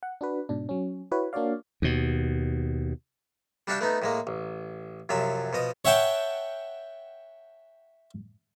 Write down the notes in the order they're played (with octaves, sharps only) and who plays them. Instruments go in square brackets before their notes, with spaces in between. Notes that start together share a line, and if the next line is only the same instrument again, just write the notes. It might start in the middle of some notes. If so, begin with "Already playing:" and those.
[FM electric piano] F#5
D4 F#4 B4
G#2 B2 D4
F#3 C#4
E4 F#4 B4 C#5
A#3 D4 F#4 C#5 D5 F5
[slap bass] D#2 B2
[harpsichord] G3 D4 F#4 E5 F5 G5
A3 B3 D#4
A2 G#3 A#3
A1
F#2 C3 F3 F#3 E5
B2 F3 D#5 D#6
C#5 E5 F#5 G5 A5